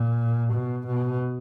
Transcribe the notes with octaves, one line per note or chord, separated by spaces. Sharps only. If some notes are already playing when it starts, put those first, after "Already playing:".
Already playing: A#2
B2
B2